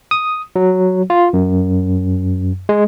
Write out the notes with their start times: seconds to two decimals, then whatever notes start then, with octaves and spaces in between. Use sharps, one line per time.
0.11 D#6
0.56 F#3
1.10 F4
1.33 F#2
2.69 G#3